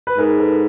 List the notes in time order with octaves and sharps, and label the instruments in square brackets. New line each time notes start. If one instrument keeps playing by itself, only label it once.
[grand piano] B4
[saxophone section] G#2 [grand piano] G#4 A#4
[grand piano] A4 B4